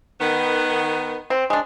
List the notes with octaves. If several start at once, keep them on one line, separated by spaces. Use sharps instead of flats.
D#3 B3
C4
G#3 D4